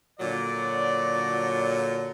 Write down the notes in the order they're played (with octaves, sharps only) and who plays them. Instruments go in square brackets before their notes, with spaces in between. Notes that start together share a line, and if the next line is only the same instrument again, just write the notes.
[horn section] A#2 D3 F#3 [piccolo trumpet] D5